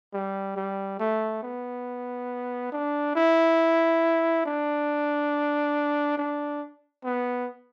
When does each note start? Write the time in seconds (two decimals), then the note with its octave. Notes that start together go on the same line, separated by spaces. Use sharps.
0.14 G3
0.57 G3
1.00 A3
1.43 B3
2.72 D4
3.15 E4
4.46 D4
6.18 D4
7.04 B3